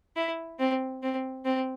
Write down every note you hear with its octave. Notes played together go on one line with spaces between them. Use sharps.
E4
C4
C4
C4